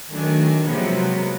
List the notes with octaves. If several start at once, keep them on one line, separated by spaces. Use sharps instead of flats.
D#3 F#3 A3 D4 G#5
C3 F3 F#3 G#3 A#3 B3